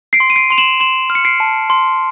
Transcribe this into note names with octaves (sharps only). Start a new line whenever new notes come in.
C7 D7
C6
D#7
C7 D7
C6 F7
E7 F#7
C6 E7 F#7
F6
C#7
C7 D7
A5
C6